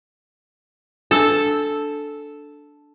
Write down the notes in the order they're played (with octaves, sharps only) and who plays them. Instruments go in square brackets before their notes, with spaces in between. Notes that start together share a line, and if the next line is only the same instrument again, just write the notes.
[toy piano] D4 E6 [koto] A4 A5